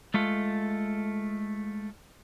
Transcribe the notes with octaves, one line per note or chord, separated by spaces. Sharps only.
G#3 A3 F4 A4